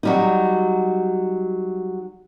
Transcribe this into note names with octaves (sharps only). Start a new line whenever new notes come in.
F#3 G3 D#4